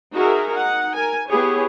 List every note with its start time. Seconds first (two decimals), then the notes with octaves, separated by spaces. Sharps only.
0.14 D#4 F#4 G#4 A#4 E5
0.54 D#4 F#5
0.94 A#4 G#5
1.28 B3 E4 G4 G#4 C#5